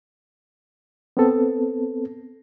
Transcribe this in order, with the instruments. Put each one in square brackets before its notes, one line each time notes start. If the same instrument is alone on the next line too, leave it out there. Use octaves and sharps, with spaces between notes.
[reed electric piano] B3 C4 A4